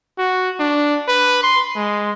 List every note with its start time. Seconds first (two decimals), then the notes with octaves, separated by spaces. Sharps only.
0.19 F#4
0.60 D4
1.08 B4
1.43 C6
1.76 G#3